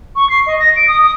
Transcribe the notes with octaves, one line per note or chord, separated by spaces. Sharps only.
C#6
C7
D#5
A#6
D7
D#6
D#6